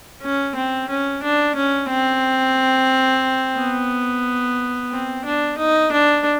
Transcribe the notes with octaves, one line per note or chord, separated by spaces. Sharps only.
C#4
C4
C#4
D4
C#4
C4
B3
C4
D4
D#4
D4